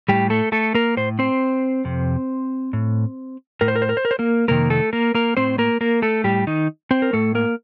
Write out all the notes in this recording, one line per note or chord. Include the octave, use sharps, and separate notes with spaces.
A2 G3 G4
A3 A4
A3 A4
A#3 A#4
A2 C5
C4 C5
F2 C3
A2
A2 A#4
C5
A#4
C5
A#4
C5
A#4
C5
A#3 A#4
F2 C3 D#3 A#3 A#4
A3 A4
A#3 A#4
A#3 A#4
A2 C4 C5
A#3 A#4
A#3 A#4
A3 A4
A2 G3 G4
D#3 D#4
C4 C5
A#4
A2 A3 A4
A#3 A#4